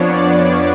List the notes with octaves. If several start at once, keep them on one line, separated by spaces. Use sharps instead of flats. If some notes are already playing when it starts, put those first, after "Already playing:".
Already playing: F2 F3 B3 D4 C#5
D5